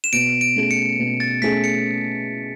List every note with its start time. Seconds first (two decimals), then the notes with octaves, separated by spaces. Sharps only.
0.04 E7
0.13 B2 D7
0.41 D7
0.56 A3 C#4 G#4
0.71 C#7
0.99 B2
1.20 A6
1.42 A3 C#4 G#4 B6
1.64 C#7